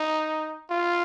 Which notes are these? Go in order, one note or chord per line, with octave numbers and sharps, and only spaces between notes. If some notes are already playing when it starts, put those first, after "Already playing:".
Already playing: D#4
F4